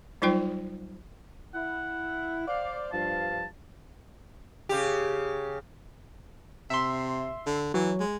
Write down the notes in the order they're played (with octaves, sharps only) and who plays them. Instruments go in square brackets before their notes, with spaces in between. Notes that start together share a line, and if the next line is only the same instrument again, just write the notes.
[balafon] F#3 G3 D#4 F4 C5 G5
[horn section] E4 [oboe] F#5
[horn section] C5 D5 F5
[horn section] G2 F3 F5 [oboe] A5
[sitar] C#3 G4
[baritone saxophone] C3 [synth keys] E5 C6
[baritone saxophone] D3
[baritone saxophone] E3 [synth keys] F#3
[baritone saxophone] G#3